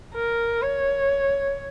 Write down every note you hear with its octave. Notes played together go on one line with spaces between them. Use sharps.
A#4
C#5